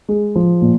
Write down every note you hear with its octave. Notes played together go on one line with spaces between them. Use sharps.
G#3
F3
A#2